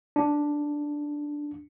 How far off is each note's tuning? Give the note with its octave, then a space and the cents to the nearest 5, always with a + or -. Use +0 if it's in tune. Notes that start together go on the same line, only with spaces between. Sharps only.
D4 +0